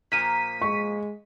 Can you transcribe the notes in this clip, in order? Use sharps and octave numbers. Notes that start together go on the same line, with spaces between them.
A#2 F3 A#3 B6 D#7
G#3 C#6